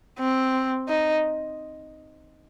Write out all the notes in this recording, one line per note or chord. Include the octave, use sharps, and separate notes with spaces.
C4
D#4